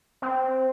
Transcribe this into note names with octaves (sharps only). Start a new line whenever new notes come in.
C4